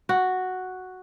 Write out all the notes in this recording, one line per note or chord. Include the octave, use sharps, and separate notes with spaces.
F#4